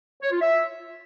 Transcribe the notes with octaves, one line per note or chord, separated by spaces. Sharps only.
C#5
F4
E5